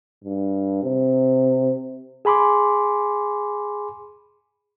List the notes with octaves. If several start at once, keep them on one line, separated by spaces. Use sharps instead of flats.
G2
C3
G#4 G#5 B5 C6 D6